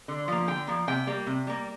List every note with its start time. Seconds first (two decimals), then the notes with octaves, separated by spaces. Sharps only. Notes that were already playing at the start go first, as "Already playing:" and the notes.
0.08 D3
0.28 F3 A#3
0.48 D3 G5
0.67 F3 A#3
0.88 C3 G5
1.07 G3 A#3
1.27 C3
1.47 G3 A#3